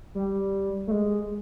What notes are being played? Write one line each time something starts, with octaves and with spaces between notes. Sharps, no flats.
G3
A3
G#3